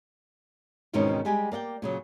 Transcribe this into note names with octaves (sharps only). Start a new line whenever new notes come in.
E2 G#2 B2 D#3 C4 C#4
G3 G#3 G4 G#5
A#3 D5 F5 G5
A#2 C#3 F#3